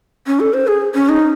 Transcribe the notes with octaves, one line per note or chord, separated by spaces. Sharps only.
C#4
A4
C5
G#4
C#4
D#4